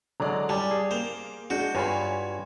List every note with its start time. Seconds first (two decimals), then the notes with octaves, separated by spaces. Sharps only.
0.20 D3 F#3 G#3 D5 A#5
0.49 G3 G#5 A5
0.71 G#4
0.91 A#3 C5 F7
1.50 G#3 D4 F#4 G6
1.75 G2 F4 C#5 G#5 B5